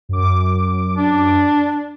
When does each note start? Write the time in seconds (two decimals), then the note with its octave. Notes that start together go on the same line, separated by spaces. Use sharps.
0.09 F#2 D6
0.96 D4